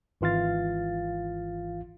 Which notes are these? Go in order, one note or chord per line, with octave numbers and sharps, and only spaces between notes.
G#1 E3 F4 F5 A6